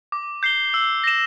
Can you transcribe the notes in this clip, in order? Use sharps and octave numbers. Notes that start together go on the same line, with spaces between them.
D6
G6 C7 G7
E6
A#6 E7